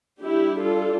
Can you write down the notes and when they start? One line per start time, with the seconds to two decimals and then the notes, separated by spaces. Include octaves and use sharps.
0.21 G3 D4 E4 G4
0.61 F4 A4